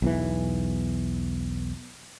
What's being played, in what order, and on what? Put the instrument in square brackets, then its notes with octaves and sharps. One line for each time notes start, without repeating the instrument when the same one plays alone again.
[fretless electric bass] B1 E2 E3